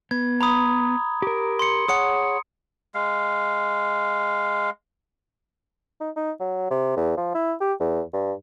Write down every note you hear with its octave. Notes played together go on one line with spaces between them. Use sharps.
B3 G#6
A#5 B5 D#6
G4 A#4
C6 C#7
G#4 C#5 F#5 D#6 C#7
G#3 F5
D#4
D#4
F#3
C3
E2
F3
E4
G4
E2
G2